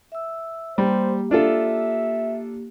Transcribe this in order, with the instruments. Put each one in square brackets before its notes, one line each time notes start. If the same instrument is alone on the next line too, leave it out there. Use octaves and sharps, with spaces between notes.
[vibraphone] E5 E6
[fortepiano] G3 [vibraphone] A#3 G4 [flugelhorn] C5
[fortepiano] D4 F4 A4 [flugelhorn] E5